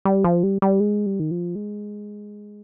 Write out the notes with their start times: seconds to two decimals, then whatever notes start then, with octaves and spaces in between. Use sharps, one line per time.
0.05 G3
0.24 F3
0.43 G3
0.62 G3
0.80 G#3
1.06 G3
1.20 D#3
1.31 F3
1.55 G#3